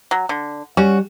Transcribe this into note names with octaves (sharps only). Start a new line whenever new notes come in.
F#3
D3
G3 C#4 F#4